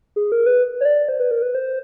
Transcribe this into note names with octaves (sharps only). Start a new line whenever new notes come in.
G#4
A#4
B4
C#5
D5
C5
B4
A#4
B4
C5